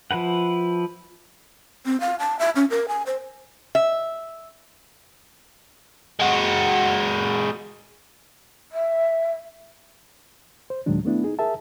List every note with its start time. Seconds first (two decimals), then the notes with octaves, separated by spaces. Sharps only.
0.11 F3 E4 B4 F#5
1.86 C4
2.00 F5
2.20 A5
2.39 E5
2.56 C#4
2.71 A#4
2.88 G#5
3.06 C5
3.75 E5
6.20 G#3 F#4
8.72 E5
10.70 C5
10.86 D#2 A#2 D#3 F#3 G#3 D4
11.05 A3 B3 D4 E4
11.24 D#4 G#4
11.39 G#4 A#4 E5 A5